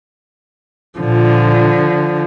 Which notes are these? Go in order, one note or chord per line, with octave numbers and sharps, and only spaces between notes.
A#2 D3 F3